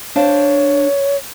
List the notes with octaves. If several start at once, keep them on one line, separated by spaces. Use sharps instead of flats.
D4 C5 C#5 F5